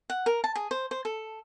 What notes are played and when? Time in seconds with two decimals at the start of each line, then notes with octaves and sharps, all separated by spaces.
0.10 F#5
0.26 A#4
0.44 A5
0.56 G#4
0.71 C5
0.91 C5
1.05 A4